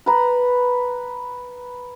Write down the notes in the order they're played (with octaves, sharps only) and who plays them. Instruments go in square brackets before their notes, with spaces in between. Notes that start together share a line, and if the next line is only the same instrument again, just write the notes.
[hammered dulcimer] B4 A#5